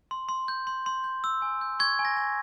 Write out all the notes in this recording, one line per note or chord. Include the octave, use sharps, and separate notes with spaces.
C6
C6
G6
C6
C6
G6
E6
G#5
G6
C#6 G#6
G#5
A#6
G#5